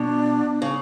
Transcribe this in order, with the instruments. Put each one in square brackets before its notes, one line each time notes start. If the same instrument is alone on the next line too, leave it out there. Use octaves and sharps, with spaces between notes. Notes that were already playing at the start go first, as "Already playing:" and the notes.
Already playing: [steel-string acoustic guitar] B2 [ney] D4
[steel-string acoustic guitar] C#3